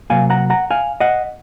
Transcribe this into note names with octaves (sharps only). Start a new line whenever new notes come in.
C3 F#3 A#3 F5 G#5
F#5 A#5
F#5 A#5
F5 G#5
D#5 F#5